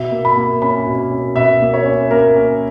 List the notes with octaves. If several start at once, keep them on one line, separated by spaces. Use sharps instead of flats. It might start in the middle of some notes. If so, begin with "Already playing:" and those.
Already playing: B2 E5
A#3
B5
A#3
C#4 B5
B2
C#4
B2 E5
A#3
C#5
C#4
A#3 A#4
C#4